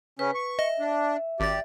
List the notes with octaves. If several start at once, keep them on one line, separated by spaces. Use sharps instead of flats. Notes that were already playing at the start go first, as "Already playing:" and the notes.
C#3 C#4 B4
C#6
D#5 E5
D4
G#1 G4 D5 A6